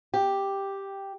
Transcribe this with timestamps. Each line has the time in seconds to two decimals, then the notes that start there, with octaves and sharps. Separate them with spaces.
0.14 G4